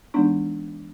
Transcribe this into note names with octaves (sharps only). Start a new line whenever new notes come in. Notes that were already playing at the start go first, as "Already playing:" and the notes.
E3 G#3 B3 D4 D#4